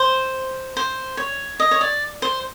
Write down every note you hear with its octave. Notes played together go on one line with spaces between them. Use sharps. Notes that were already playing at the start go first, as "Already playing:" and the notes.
Already playing: C5
C5
C#5
D#5
C#5
D5
C5